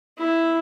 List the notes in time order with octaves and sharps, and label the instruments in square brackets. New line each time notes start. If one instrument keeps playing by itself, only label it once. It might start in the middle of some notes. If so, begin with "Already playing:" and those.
[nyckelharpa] E4